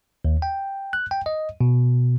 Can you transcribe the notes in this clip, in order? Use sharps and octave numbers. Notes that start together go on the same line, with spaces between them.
D#2
G5
F#6
G5
D#5
B2